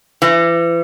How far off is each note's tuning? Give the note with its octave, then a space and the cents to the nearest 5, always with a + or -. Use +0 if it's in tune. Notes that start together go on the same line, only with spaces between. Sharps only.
E3 +35